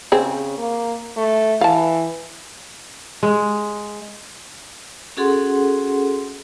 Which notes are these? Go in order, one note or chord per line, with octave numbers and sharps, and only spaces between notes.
C#3 C4 G#4
A#3
A3
E3 F5 A5
G#3
C#4 F#4 G#4 A4 F#5 C6